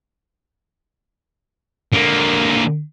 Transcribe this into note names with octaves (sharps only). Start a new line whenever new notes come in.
D3 A#3